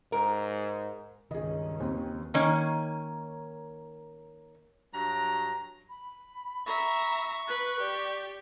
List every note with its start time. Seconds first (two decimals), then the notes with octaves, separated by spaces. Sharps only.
0.12 G#2 A#4
1.31 C#2 G2 D#3 C#4 G#4 D#5
1.80 D#2 C4
2.34 D#3 A#3 C#4
4.93 G2 F#3 A#5
5.89 B5
6.66 E5 A#5 C#6
7.48 B4 F#6
7.80 G4 D5